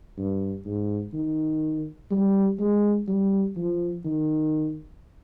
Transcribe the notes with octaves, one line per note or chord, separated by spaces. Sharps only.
G2
G#2
D#3
G3
G#3
G3
F3
D#3